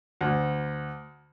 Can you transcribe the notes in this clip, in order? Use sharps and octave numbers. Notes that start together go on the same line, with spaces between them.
D2